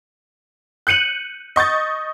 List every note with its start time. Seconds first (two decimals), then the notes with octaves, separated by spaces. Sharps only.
0.87 F#6 G6 C#7 D#7 F#7
1.56 D#5 C#6 G6 A6